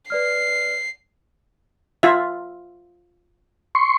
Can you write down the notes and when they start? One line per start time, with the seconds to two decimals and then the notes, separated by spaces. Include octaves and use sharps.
0.10 B4 D5 F6 C7
2.03 F4 E5
3.75 C6 C#6